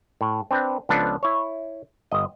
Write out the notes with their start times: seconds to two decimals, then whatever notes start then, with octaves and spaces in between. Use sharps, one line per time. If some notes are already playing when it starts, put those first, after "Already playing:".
0.21 A2
0.51 C4 D4 B4
0.89 C#2 F3 B3 D4 A4 B4
1.23 E4 C#5
2.12 G1 D#5